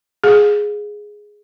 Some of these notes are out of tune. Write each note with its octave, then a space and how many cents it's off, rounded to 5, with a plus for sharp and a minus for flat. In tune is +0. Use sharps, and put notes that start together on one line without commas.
G#4 +0 F5 +35